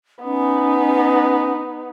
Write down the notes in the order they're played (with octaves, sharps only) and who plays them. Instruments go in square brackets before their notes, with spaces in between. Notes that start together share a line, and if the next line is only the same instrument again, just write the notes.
[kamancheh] B3 D#4 [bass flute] C#4